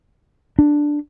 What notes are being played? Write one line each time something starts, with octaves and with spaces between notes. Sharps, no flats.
D4